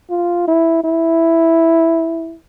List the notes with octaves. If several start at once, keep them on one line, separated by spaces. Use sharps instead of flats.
F4
E4
E4